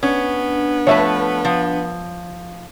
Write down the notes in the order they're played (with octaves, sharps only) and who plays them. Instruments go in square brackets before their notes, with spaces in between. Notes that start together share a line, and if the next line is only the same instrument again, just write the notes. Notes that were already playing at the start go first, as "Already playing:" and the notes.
[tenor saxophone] B3 [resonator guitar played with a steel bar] C#4 [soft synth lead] D4
[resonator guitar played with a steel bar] F3 A3 B4 [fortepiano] C#5 E5
[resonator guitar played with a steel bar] F3